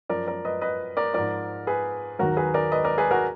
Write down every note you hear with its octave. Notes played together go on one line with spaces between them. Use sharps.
F#2 F3 A#4 D5
A#4 D5
B4 D#5
B4 D#5
A#4 D5
G#2 F3 A#4 D5
G#4 B4
D#2 D#3 F#3 F#4 A#4
G#4 B4
A#4 D5
B4 D#5
A#4 D5
G#4 B4
F#4 A#4